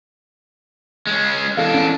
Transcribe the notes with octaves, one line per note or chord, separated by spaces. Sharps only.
G#3 C#4
E2 D4 A4 F5
C#4